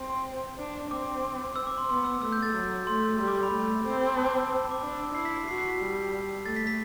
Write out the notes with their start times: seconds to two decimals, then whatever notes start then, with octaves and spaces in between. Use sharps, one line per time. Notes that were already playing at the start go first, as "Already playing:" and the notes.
Already playing: C4
0.10 C6
0.59 D4
0.91 C4 D6
1.56 E6
1.67 D6
1.78 C6
1.89 B3 C6
2.04 E6
2.22 A3 E6
2.32 G6
2.42 A6
2.54 F#3
2.87 A3 C6
3.19 G3 C6
3.28 D6
3.36 C6
3.43 B5
3.52 A3
3.84 C4
4.17 A5
4.28 D6
4.39 E6
4.71 D6
4.82 D4 E6
4.99 E6
5.14 E4 C7
5.25 B6
5.36 B6
5.47 F#4 C7
5.58 C7
5.68 B6
5.80 G3
6.45 A3 A6
6.56 B6
6.67 B6